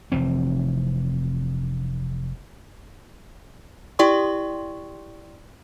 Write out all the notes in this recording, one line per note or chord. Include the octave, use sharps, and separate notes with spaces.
F1 E3 C4
E4 G4 D5 G5 C6 C#6